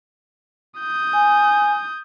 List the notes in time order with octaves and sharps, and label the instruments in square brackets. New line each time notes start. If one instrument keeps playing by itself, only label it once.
[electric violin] D#6 G6
[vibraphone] G#5